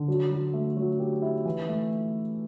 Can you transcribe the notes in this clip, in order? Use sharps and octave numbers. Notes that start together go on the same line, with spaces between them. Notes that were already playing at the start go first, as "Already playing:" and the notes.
Already playing: D3
F#3
F#3
A3
F#3
G4
E4
E3
A3